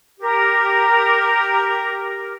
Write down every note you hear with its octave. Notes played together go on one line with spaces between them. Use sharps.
G4 A#4